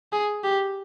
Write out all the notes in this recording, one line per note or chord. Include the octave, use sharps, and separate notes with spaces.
G#4
G4